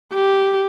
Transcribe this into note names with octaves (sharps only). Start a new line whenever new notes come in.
G4